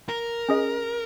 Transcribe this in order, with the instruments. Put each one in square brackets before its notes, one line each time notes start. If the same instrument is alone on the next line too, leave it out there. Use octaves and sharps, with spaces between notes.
[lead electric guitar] A#4
[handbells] C#4 G#4 D#5